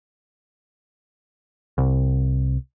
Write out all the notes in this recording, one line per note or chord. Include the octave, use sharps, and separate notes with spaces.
C2